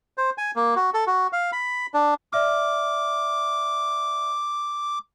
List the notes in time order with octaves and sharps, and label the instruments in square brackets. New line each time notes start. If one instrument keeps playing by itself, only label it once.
[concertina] C5
G#5
A#3
F#4
A4
F#4
F5
B5
D4
[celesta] D5 E5 F6 [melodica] D6